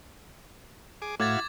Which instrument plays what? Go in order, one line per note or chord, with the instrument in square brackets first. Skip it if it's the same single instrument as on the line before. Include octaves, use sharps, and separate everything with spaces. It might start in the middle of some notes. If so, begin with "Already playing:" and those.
[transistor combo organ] G#4 D6
[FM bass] A2 [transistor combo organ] E4 F#4 F5 [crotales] D6 G#6 A6